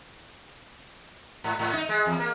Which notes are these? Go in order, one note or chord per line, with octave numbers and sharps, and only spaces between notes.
G#2
G#2
D#4
G#3
E2
A#3